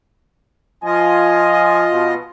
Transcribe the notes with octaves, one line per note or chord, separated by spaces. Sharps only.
F3 F4 D#5 G#5
B2